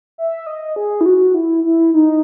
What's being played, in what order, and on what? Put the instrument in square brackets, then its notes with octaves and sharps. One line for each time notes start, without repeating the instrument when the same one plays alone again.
[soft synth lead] E5
D#5
G#4
E4
F#4
E4
E4
D#4